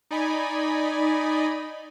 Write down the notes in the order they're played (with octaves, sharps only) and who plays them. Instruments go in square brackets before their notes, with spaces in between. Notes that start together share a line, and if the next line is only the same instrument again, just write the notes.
[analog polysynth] D#4 D5 D#5 G#5 B5